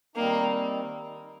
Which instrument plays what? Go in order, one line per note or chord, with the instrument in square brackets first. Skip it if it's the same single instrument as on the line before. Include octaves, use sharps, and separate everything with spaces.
[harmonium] D#3 G3 C4 D#4 [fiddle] A#3